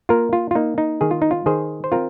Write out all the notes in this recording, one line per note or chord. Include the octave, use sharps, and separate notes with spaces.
A#3 F4 A#4
F4
F4
A#3 D#4
D#4
D#3 G#4
F4
D#4
F4
D#3 G#4 C5
C5
C4 F4 A#4